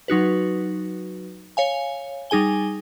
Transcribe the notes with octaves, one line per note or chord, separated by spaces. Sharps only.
F#3 D#4 F#4 B4
C#5 F5 G#5
G3 D#4 G#4 G#5 G7